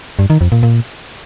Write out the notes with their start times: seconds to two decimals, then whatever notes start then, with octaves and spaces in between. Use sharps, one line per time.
0.19 G2
0.30 D#3
0.41 F2
0.52 A#2
0.63 A#2